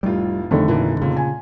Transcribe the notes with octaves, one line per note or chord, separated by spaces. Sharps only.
F1 A2 G3 F4
F1 D3 D#3 F3 A3
A#2 E3 A#3
A#2 C#3
G#5